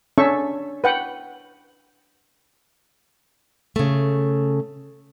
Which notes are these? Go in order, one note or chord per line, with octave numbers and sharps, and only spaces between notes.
C#4 D4 A4 E5 C#6
B4 F#5 G5
C#3 A3